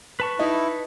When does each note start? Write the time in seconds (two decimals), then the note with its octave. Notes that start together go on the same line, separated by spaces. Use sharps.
0.20 B4 A5 C#6
0.39 D#4 E4